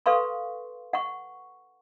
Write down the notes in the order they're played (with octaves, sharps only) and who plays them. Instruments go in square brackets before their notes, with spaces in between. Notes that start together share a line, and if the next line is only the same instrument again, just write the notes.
[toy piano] A4 B4 F5 C6 C#6
F#5 C#6